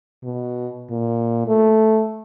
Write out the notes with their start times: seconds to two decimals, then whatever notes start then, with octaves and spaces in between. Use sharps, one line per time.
0.24 B2
0.90 A#2
1.47 A3